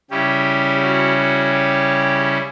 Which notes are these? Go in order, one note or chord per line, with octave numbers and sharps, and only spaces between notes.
C#3 G3 C#4 E4 G4
F#4
F#4
G4